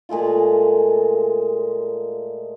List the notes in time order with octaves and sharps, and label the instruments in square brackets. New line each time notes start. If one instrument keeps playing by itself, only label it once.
[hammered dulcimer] A#2 G#3 A3 F4